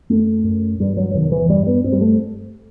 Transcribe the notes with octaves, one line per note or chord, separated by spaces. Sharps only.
F#2 A3
F#2
G2 G3
F#3
E2 C3 D#3
E3
G2 G3
B3
G2 C4
G3
A3